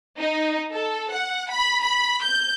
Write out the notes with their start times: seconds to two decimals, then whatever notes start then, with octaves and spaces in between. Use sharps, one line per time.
0.19 D#4
0.72 A4
1.12 F#5
1.51 B5
1.82 B5
2.23 G6